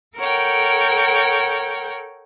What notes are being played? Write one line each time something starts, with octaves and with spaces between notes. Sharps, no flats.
A4 A#4 C#5 F#5 G5